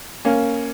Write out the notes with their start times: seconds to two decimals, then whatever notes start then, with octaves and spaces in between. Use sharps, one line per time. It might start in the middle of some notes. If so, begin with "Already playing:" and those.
0.25 A#3 C#4